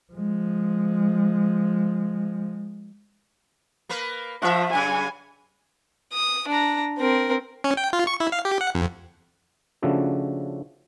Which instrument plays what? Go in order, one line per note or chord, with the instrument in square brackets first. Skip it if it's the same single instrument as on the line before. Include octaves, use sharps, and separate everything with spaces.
[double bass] F3 G#3
[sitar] A#3 A#4 B4
[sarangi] F3 [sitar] F4 E5
[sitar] F#2 C#3 [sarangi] G#5
[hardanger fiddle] D#6
D4 A#5
C4 A#4
[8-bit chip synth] C#4
G5
F4
C#6
E4
F5
G4
F#5
F2
[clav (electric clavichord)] C#3 F3 A3 D4 F#4 A4